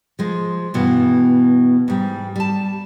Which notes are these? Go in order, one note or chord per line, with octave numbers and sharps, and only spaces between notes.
F3 G#3
G2 B2 E3
G#2 G3
G3 A5